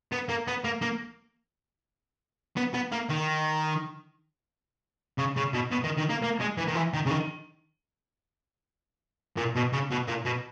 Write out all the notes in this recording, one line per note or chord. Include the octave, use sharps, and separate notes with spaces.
B3
A#3
B3
A#3
A#3
B3
B3
A#3
D#3
C#3
C#3
B2
B2
D#3
D#3
A#3
A#3
G#3
E3
D#3
E3
D#3
C#3
D#3
A#2
B2
C#3
B2
A#2
B2